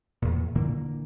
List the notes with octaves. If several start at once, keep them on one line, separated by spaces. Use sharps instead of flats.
E2 A#2
A#2 D3 E3 A#3